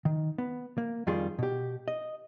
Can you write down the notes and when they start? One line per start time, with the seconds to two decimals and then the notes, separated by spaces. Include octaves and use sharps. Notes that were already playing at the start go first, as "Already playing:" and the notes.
0.05 D#3
0.38 B3
0.78 A#3
1.07 F2 D#3 G3 F4 G#4 C6
1.39 B2 G4
1.88 D#5